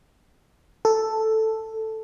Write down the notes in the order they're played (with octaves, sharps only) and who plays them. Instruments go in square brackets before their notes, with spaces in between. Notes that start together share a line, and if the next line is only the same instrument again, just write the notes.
[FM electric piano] A4